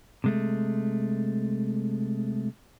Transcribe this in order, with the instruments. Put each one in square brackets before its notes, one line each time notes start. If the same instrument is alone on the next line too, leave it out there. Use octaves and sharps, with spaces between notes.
[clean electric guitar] C3 G#3 A3